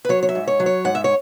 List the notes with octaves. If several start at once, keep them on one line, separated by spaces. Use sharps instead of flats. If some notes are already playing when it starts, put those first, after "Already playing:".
B4
F#3 C#5
C#5
E5
G#2
C#5
F#3
C#5
G#2 F#5
E5
C#5